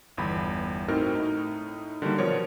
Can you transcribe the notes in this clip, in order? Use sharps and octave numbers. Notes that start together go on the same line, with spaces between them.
G1 E2 B5
A2 C4 D#4 F#4 A#4 F6
A2 D#4
D3 D#3 F#3 G3 A#3
B2 F3 A#4 C#5 D5